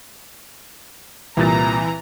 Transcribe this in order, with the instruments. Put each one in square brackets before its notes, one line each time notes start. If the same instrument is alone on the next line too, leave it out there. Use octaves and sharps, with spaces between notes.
[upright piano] C2 A#2 A6 [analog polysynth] E3 [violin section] A#5